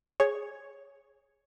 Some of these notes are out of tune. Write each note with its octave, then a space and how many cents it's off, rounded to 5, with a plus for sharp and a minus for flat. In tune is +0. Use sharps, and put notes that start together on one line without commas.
G#4 +0 C#5 +0